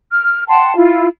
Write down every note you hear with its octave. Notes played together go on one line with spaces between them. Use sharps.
F6
F#5 G5 A5 C6
E4 F4